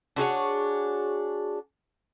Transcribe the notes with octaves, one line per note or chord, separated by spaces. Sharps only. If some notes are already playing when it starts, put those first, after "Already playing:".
D4 F#4 G#4 C#5